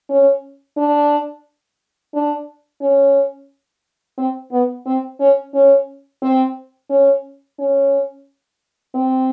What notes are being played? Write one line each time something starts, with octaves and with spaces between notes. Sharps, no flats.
C#4
D4
D4
C#4
C4
B3
C4
C#4
C#4
C4
C#4
C#4
C4